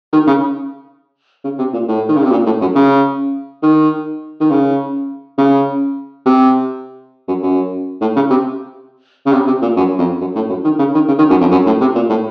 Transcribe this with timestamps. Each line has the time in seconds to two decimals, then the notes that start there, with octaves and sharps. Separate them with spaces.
0.13 D#3
0.27 C#3
1.44 C#3
1.59 C3
1.73 A#2
1.88 A2
2.09 D#3
2.16 C#3
2.24 C3
2.31 A#2
2.46 A2
2.61 F#2
2.75 C#3
3.63 D#3
4.40 D#3
4.51 C#3
5.38 C#3
6.26 C3
7.28 F#2
7.43 F#2
8.01 A2
8.16 C#3
8.30 C3
9.26 C#3
9.33 C3
9.47 C3
9.62 A#2
9.77 F#2
9.98 F2
10.20 F#2
10.35 A2
10.49 F#2
10.64 D#3
10.79 C#3
10.94 D#3
11.08 C#3
11.19 D#3
11.30 F#2
11.41 F2
11.51 F#2
11.66 A2
11.81 C3
11.95 A#2
12.10 A2